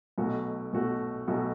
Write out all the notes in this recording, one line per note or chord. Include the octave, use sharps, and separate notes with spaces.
B1 B2 A3 F#4
B1 B2 A3 F#4
B1 B2 A3 F#4